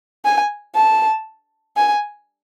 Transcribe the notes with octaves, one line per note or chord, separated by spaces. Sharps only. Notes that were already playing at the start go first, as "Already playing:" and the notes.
G#5
A5
G#5